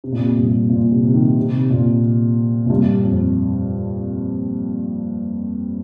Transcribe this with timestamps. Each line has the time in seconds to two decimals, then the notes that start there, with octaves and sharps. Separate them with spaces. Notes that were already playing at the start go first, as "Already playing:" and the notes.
0.04 C3
0.12 A#2
0.21 C3
0.37 G2
0.70 A#2
0.92 C3
1.04 C3
1.14 D#3
1.37 C3
1.70 A#2
2.66 A#2
2.70 G2
3.04 F2